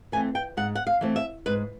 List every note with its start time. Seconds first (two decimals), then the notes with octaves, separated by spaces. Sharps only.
0.12 E3 A3 C4 G#5
0.35 G5
0.57 G#2 F#5
0.75 F#5
0.87 F5
1.01 E3 A3 C4
1.16 E5
1.46 G#2 B4